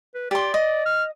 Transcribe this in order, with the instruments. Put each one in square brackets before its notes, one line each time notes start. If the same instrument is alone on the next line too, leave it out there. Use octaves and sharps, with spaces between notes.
[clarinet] B4
[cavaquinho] G4 C6 [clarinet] D5
[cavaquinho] D#5
[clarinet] F6